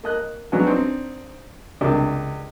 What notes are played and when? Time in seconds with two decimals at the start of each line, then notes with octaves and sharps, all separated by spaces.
0.04 A#3 D#5 F#6
0.52 F#3 G#3 B3 C#4 D4 F#4
0.67 C4 D4 D#4
1.81 C#2 C3 A#3 D4 G4